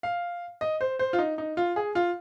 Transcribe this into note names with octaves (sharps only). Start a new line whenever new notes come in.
F5
D#5
C5
C5
F4
D#4
D#4
F4
G#4
F4